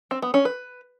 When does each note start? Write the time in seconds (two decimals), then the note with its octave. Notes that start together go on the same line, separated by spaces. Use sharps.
0.11 C4
0.22 B3
0.34 C#4
0.45 B4